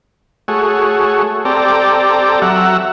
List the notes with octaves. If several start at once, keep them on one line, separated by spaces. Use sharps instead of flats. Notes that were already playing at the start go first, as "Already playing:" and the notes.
A3 F#4 G#4 C#5
C4 G4 A4 D5 A#5
F#3 E5 F#5 A#5